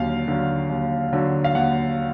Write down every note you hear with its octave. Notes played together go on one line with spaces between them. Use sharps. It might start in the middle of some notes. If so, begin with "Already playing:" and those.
Already playing: D#2 D3 F#3 F5
D3 F#3
D#2
D3 F#3
F5
D#2 F#5